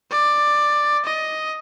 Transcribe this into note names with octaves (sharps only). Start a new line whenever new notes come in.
D5
D#5